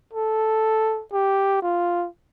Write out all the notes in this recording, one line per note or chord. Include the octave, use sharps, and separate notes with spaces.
A4
G4
F4